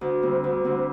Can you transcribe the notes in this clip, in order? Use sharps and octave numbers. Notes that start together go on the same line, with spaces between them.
D2
D3 G3 C4
D2
D3 G3 C4